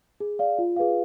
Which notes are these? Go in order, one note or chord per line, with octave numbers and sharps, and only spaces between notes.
G#4
D5 F5
F4
G#4 B4 F5